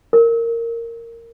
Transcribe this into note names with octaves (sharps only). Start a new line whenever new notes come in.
A#4